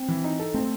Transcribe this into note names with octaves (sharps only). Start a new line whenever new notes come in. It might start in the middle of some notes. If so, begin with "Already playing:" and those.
Already playing: C4
E3
D#4
A4
A3 C4